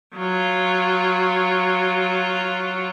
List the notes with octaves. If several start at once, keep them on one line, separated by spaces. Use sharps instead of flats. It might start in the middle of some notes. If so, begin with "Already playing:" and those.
F#3 F4